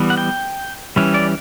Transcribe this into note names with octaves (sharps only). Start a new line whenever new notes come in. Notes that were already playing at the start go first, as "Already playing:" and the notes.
Already playing: E3 G3 B3
F#5
G5
E3 G3 C#4
D5